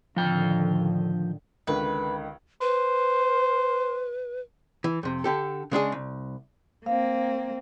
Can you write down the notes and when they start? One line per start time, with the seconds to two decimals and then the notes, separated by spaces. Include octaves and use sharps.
0.16 A2 D3 D#3 F3 G5
1.67 C#2 D3 D#3 B4
2.61 B4 C5
4.84 E3
5.03 F2 C3
5.24 D3 G4 A4
5.72 C#3 G#3 D4 G#4
5.92 C2
6.86 A#3 C4 F5